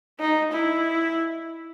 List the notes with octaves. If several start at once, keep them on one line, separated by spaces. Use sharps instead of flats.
D#4
E4